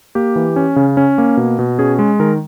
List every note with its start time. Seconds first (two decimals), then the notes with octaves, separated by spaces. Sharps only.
0.15 A#3 G4
0.36 E3
0.56 C#4
0.76 C#3
0.97 C#4
1.18 A#3
1.37 B2
1.59 B2
1.79 C#4 G#4
1.99 G#3
2.20 D#3 A#4